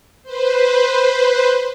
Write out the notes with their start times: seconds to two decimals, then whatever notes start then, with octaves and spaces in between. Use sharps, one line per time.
0.23 B4 C5